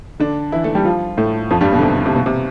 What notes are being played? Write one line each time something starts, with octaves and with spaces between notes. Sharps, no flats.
D3 D4
E3 E4
A3 A4
G3 G4
F3 F4
A2 A3
F2 F3
G2 G3
B2
D3
C3
D3
C3
B2
C3